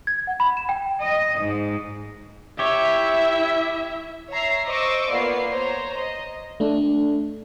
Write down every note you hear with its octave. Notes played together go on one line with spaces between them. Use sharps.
G#6
F#5
B5
E7
G5
D#5
G#2
E4 G4 C#5 E5
C#5 E5 A#5 C7
C5 D#5 C#6 D6 E6
A#3 B3 F4 D5 C7
C5 C#5 A#5
D#5
A3 D4